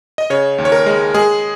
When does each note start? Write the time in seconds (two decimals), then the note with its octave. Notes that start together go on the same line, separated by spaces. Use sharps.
0.18 D#5
0.30 C#3 C#5
0.58 D#2
0.65 C#5
0.72 A#4
0.86 G#3
1.14 G#3 G#4